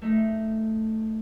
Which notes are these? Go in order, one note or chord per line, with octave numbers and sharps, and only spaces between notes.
A3 D#4